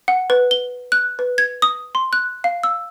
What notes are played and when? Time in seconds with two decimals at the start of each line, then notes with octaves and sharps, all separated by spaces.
0.08 F#5
0.30 B4
0.51 G7
0.92 F#6
1.19 B4
1.38 G#6
1.62 D#6
1.95 C6
2.13 F#6
2.44 F5
2.63 E6